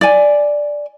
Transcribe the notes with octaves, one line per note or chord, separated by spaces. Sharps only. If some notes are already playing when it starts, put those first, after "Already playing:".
D5 G#5